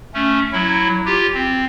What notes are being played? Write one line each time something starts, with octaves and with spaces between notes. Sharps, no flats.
A3 C#4
F#3 E4
F4 G4
C4